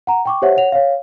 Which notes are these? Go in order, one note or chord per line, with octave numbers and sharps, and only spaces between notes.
F#5 A#5
G5 C#6 D6
G4 C5 C#5 E5 F#5
C#5 F#5 F7
C#5 F5